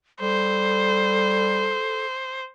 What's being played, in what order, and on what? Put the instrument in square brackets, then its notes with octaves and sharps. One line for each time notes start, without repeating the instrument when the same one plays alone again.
[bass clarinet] G3 [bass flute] A4 [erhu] C5